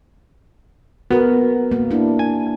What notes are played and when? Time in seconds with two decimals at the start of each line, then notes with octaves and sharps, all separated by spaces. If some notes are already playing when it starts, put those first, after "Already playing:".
1.11 B3 F#4 A#4
1.71 A#3
1.91 D4 E4
2.19 G#5